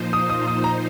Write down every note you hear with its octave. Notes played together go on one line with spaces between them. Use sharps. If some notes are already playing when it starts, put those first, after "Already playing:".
Already playing: A#2 F3 D#4 C5
D#6
D#6
D#6
A#5